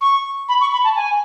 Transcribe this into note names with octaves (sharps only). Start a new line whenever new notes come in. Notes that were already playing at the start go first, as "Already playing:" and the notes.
C#6
B5
C#6
B5
A5
G#5